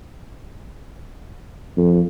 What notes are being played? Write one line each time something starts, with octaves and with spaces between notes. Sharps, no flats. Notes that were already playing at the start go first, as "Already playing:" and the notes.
F2